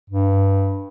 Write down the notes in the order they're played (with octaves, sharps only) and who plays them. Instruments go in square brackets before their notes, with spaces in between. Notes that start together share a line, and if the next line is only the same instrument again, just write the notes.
[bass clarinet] G2